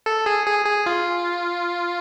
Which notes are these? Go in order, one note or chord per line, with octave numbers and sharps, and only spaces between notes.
A4
G#4
G#4
G#4
F4